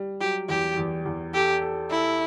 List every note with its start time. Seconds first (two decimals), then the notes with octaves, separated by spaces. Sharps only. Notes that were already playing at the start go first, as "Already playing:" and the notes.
Already playing: G3
0.21 F#3 G4
0.49 E2 G4
0.77 E2
1.06 E2
1.34 G4 A4
1.62 A4
1.90 E4 A4